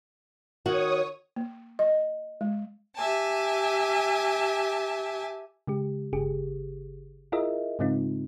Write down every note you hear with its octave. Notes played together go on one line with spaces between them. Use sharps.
D#3 F#4 C#5 D#6
A#3
D#5
G#3
G4 E5 G#5 A5
C#3 G#3 G4
G1 C#3 G4 G#4
E4 F4 G#4 A#4 D#5 E5
G#2 C#3 G#3 C4 D#4 F4